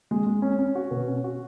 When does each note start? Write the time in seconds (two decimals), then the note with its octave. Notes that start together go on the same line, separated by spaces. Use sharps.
0.11 G#3
0.27 G#3
0.42 C#4
0.59 C#4
0.75 F#4
0.91 B2
1.08 C#4
1.24 F#4